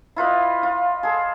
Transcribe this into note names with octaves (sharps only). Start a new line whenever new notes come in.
E4 F4 B4 D#5
F4
G#4 A4